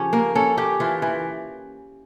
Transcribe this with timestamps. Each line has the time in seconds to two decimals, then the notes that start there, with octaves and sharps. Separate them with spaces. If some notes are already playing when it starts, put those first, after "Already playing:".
Already playing: C#3 F3 C#4 G4 A4
0.13 A#3
0.35 C#4 A4
0.57 C#4 G4
0.80 E3 F4
1.02 E3